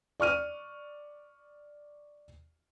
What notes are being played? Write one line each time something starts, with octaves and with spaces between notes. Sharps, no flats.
D5 C#6 F6 D#7